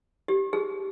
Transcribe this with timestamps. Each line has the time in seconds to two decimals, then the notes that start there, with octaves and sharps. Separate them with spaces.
0.28 G4
0.53 G#4